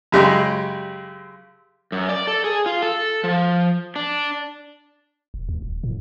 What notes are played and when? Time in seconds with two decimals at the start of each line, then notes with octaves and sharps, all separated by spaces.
0.12 F#2 C#3 G#3 G4
1.92 F#2
2.09 D5
2.27 A4
2.44 G#4
2.66 F4
2.82 A4
3.24 F3
3.96 D4
5.34 D#1
5.49 D2
5.62 D#1
5.84 A2